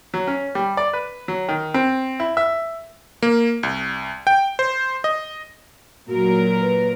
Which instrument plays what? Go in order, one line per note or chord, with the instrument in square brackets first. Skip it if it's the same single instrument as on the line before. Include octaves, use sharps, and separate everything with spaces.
[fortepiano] F#3
C#4
G3
D5
B4
F#3
D#3
C4
E4
E5
[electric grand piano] A#3
C2
G5
C5
D#5
[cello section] A#2 F#3 A#4 [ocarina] F#4
[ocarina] B4